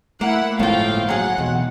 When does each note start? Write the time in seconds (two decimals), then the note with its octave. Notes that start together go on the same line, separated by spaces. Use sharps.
0.21 A3 A#3 E4 F#5
0.59 G1 A2 F3 G#3 A#3 F5 G5
1.09 F#3 G#4 F#5
1.38 B1 E2